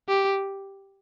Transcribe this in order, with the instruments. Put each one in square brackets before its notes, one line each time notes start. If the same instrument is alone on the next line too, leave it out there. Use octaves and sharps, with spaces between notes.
[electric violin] G4